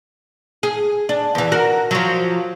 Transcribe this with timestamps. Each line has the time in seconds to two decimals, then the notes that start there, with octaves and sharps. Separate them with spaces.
0.63 G#4
1.09 D4
1.35 E2 E3
1.52 F#4 A#4
1.91 F3 F#3